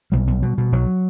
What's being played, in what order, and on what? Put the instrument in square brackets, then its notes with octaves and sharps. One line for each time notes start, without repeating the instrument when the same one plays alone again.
[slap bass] B1 G3
B1
B2
B2
B1 F#3